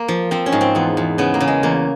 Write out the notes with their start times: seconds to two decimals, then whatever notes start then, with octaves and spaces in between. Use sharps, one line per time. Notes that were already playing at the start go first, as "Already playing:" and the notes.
Already playing: A#3
0.08 F3
0.31 F3 C4
0.46 C#4
0.52 G#2
0.61 C4
0.75 E2 B3
0.97 E2
1.18 C#3 B3
1.34 A#3
1.40 C#3
1.48 G#3
1.63 E2 A#3